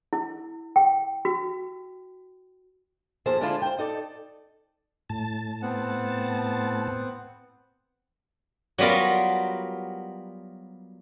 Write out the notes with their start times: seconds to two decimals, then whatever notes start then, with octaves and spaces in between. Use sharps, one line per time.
0.13 E4
0.76 G5
1.25 F#4
3.26 D#2 F3 G#4 A4 C5 A5
3.41 D3 G#3 D4 E4 F4 A5
3.62 C5 G5
3.78 D#4 A4 D5
5.10 A2 A5
5.62 B3 C4 F#5
8.78 F#3 G3 B3 F4 A#4